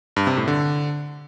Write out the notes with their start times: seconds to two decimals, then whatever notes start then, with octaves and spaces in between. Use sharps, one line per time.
0.16 G2
0.27 C3
0.37 A2
0.48 D3